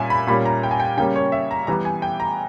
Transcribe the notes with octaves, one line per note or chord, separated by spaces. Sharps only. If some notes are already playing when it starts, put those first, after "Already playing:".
Already playing: A#2 G3 C#4 E5 G#5
B5
A#2 G3 A#3 C#4 B5
A#5
G5
G#5
G5
C#3 G3 A#3 C#4 G5
C#5
E5
A#5
E3 G3 B3 A#5
G#5
G5
A#5